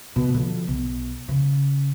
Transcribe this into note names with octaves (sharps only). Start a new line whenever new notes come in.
B2
D3 F3
B1
C#3